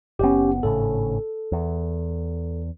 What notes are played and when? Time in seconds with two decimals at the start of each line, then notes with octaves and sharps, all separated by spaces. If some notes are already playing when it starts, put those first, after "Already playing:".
0.19 F#1 B3 C#4 G4
0.63 G#1 A2 C#3 A4
1.52 E2